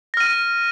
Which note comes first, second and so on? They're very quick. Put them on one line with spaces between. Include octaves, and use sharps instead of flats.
A#6 F6 D#7